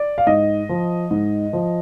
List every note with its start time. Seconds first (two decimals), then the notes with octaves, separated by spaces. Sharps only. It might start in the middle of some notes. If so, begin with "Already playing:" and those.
Already playing: D5
0.18 F5
0.27 G#2 D#5
0.69 F3
1.11 G#2
1.53 F3